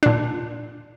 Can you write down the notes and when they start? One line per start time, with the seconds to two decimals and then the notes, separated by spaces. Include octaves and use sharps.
0.03 A#2 D4